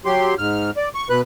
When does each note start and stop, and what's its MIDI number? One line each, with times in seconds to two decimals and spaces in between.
0.05 0.35 54
0.05 0.35 67
0.05 0.35 84
0.38 0.70 44
0.38 0.70 89
0.77 0.89 74
0.95 1.08 85
1.10 1.21 47
1.10 1.21 71
1.10 1.21 90